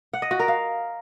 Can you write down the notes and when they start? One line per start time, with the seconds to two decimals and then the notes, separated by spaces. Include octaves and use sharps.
0.14 F#5
0.22 D#5
0.31 F#4
0.40 A#4
0.48 F5